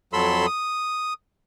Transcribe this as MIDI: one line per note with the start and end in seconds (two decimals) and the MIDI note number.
0.13 0.46 41
0.13 0.46 54
0.13 0.46 69
0.13 0.46 83
0.13 0.46 84
0.13 0.46 88
0.46 1.13 87